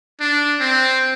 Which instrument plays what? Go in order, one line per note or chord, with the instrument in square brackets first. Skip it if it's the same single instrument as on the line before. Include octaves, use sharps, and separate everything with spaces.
[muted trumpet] D4
C4